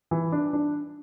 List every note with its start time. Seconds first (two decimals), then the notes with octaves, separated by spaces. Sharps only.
0.11 E3
0.32 D4
0.53 D4